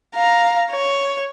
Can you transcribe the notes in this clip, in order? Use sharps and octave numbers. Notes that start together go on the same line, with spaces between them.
F5 A#5
C#5